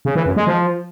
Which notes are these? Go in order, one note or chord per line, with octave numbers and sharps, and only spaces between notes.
C#3
E3
F#2
G#3
F3